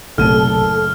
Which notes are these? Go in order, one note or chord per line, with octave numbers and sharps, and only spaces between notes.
F#1 B1 A2 C3 A4 F6 D#7